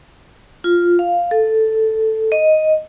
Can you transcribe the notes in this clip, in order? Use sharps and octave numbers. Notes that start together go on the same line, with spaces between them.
F4
F5
A4
D#5